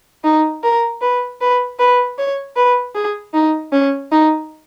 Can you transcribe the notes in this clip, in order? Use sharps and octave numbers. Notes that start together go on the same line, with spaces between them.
D#4
A#4
B4
B4
B4
C#5
B4
G#4
D#4
C#4
D#4